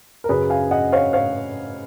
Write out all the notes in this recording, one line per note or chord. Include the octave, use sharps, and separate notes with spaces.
A#4
F#2 C#3 G#4 B4
F5 G#5
D#5 F#5
C#5 F5
C#5 F5